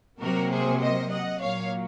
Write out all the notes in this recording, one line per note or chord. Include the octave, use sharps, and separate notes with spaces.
C3 F#3 A#3 F#4 A#4
G#4 C5
C5 D#5
D#5 F#5
A#2 F#3 A#3 C#5 F5